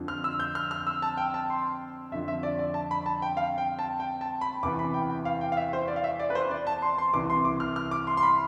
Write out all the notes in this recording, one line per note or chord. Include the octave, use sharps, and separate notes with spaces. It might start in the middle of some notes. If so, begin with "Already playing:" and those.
Already playing: F2 D3 F3
F6
E6
G6
F6
F6
E6
A5
G5
A5
C6
F2 D3 F3 E5
E5
D5
D5
A5
B5
A5
G5
F5
G5
A5
G5
A5
B5
E2 C3 E3 D6
B5
G5
G5
F5
G5
F5
E5
C5
D5
F5
E5
D5
B4
C5
D5
A5
C6
C6
C2 C3 E3 D6
C6
D6
F6
F6
D6
C6
C6
B5